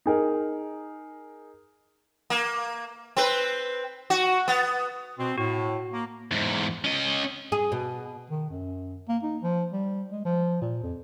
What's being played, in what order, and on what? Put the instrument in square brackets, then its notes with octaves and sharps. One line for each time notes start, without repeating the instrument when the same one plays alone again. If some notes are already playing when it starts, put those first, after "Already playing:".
[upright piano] D#4 G#4 A#4
[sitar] A#3
C4 B4
F#4
B3
[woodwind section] B2 C4
[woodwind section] A2 [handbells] F#4
[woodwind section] A#3
[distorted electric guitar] E2 G#2
C#4 D#5
[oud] G#4
B2
[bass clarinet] D#3
F#2
A#3
D#4
F3
G3
G#3
F3
A#2
F2